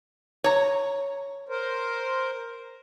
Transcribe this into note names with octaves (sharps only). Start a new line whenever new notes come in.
C#5 A#5
A#4 C5